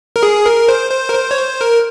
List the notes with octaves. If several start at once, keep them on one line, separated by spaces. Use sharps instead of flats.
A#4
G#4
A#4
C5
C5
A#4
C5
C#5
C5
A#4